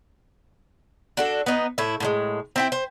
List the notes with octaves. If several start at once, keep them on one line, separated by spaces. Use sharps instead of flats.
D4 F#4 A4
B3 D#4
A2 E4
A2 D3 G#3
C4 E4 G5
C5